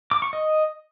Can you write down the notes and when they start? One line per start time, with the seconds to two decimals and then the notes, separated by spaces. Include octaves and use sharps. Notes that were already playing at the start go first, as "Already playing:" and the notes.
0.11 D6
0.22 C#6
0.33 D#5